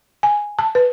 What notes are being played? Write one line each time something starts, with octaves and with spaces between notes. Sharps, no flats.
G#5
A5
B4